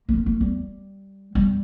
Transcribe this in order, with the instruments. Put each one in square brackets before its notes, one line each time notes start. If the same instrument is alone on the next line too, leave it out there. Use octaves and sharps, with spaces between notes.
[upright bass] A#3
C4
A#3
G3
G3